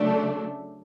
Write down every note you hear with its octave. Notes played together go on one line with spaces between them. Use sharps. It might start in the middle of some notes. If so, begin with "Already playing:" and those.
Already playing: C#3 F#3 A3 D4